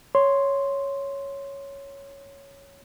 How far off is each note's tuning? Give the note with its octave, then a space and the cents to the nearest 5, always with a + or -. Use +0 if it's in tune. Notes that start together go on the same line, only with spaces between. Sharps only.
C#5 +0 C6 +0